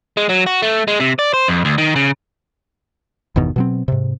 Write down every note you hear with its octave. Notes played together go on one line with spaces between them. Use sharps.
G#3
F#3
F#4
A3
G#3
C3
D5
C5
F2
D2
D#3
C#3
G1 E2 B2 D#3
B2 F#3 C4
G#2 C3